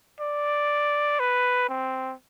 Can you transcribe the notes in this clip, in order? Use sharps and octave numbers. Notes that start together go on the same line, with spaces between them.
D5
B4
C4